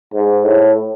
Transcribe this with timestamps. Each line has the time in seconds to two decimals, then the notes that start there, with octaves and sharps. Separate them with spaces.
0.14 G#2
0.44 A2